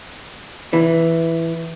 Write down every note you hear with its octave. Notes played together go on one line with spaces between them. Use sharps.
E3